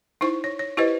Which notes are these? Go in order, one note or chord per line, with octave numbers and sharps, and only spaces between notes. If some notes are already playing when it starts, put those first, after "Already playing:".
D#4 E4 C5 C#6
C#5
C#5
E4 G4 B4 C5 D#5